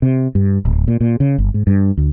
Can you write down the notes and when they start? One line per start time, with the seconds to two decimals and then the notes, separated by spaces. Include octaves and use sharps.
0.02 C3
0.35 G2
0.65 D1
0.88 A#2
1.01 A#2
1.20 C#3
1.38 G1
1.54 G#2
1.67 G2
1.97 D2